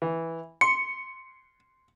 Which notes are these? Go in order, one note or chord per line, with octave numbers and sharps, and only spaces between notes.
E3
C6 C#7